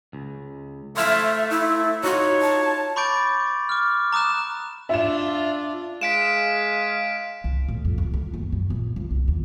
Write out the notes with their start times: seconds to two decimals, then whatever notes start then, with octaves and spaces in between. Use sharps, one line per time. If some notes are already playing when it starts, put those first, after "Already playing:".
0.13 C#2
0.97 A3 C5 E5 F5 A5
1.50 E4
2.04 D#4 F4 F#4 C#5
2.41 A5
2.96 B5 C#6 D6 G6 A6 D7
3.69 D6 F6
4.13 A#5 D6 D#6 F#6 E7
4.89 D4 F4 E5 E7
6.01 G#3 F5 B6 D7 E7
7.44 C2
7.68 A2
7.85 F2
7.98 C#2
8.14 D2
8.34 F#1
8.52 F#2
8.70 A#1
8.96 C#2
9.11 C2
9.28 D#2